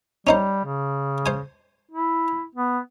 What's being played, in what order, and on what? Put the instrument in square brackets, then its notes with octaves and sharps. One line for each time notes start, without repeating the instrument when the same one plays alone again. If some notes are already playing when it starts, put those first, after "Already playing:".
[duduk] G3 [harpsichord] C#4 D#4 C5
[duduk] C#3
[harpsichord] C5 G#5
[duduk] E4
B3